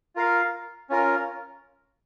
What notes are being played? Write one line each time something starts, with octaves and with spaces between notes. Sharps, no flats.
F4 A#4 F5
C#4 F4 A#4